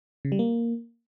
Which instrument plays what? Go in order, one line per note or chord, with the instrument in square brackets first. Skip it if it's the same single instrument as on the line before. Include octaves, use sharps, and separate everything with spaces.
[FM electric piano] C#3
G3
A#3